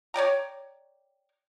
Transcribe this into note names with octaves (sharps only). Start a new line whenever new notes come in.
C#5 D5 G5 A#5